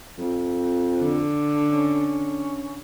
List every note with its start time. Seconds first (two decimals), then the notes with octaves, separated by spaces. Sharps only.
0.18 F2
0.99 D3
1.71 C#4